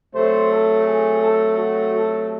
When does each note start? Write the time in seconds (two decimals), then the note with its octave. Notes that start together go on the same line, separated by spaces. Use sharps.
0.14 C3 F#3 A3 C5
0.50 A4
0.85 G#4
1.22 A4
1.57 F#4
1.94 A4